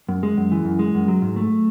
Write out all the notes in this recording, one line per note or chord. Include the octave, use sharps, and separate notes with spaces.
F#2
G#3
F#2
E3
F#2
G#3
F#2
F#3
G#2
A3